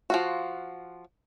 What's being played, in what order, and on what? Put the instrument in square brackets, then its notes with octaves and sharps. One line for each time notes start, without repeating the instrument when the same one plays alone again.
[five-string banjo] F3 F4 F#4